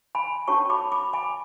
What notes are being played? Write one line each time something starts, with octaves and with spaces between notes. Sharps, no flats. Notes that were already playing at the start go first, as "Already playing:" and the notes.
G#5 B5
C#4 F#4 A4 C#5 A5 C#6
B5 D6
B5 D6
G#5 B5